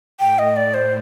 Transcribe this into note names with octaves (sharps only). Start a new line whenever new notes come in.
A2 G5
D#5
D5
C5